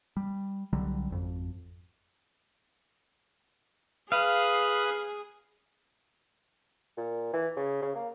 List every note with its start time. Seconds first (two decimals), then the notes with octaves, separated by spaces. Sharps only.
0.17 G3
0.73 C2 D3 F#3 G3
1.10 G#1 F2
4.12 G#4 B4 F5 D#6 F#6
6.98 A#2
7.33 E3
7.56 C#3
7.82 C#3
7.95 A#3